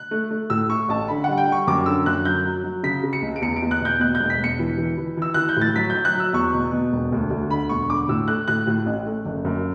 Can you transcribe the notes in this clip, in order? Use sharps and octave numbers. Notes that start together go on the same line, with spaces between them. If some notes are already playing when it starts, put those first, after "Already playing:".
Already playing: F#6
A3
A3
A2 E6
A3 C#6
A1 A5
D3 B5
G3 F#5
G5
G3 C#6
F#2 D6
D3 E6
F#2 F#6
F#3 G6
F#3
F#3
C#3 B6
C#3
C#7
C#2
D7
E2 C#7
D7
E2
F#6
B2 G6
B2 F#6
G6
E1
B6
E1
C#7
E3
E3
E3
E3 E6
E3 F#6
G6
A2 A6
F#3 B6
G6
F#3
F#6
F#3
E6
E2 C#6
B2
B2
E1
D2
D2
D3 B5
E1 C#6
D3 D6
A2 E6
A3 F#6
A2 F#6
A2
A1
A3
F#1
F#2